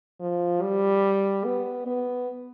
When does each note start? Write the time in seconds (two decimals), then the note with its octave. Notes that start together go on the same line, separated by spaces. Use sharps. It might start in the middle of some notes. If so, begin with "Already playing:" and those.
0.20 F3
0.62 G3
1.45 B3
1.86 B3